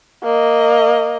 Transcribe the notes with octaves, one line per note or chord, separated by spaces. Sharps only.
A#3 D#5